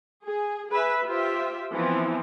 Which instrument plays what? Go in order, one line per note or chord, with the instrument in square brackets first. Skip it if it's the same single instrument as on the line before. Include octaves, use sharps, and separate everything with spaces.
[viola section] G#4
G#4 B4 E5
F4 G4 C5 E5
E3 F3 B3 C4